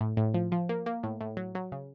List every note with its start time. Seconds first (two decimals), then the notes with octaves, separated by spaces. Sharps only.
0.01 A2
0.17 A2
0.34 F3
0.52 F3
0.69 A#3
0.86 A#3
1.03 A2
1.21 A2
1.37 F#3
1.55 F#3
1.72 C#3